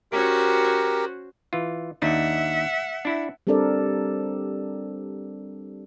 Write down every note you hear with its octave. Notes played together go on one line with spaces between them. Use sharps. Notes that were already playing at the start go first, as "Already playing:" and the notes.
C#4 F#4 G4 A#4 C5
E3 F4
D#2 D4 D#4 E5 F#5
D4 E4
G3 C4 D4 A4 A#4 D5